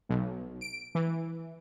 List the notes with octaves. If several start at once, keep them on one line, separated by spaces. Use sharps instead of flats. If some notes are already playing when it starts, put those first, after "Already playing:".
B1
D7
E3